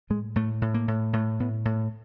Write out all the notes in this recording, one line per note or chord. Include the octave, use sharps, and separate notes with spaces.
A2 G#3
A2 A3
A2
A#3
A2
A2 A3
A2 B3
A2